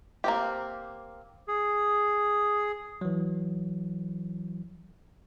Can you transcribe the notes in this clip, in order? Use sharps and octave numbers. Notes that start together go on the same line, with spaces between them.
A#3 C4 G4
G#4
E3 F#3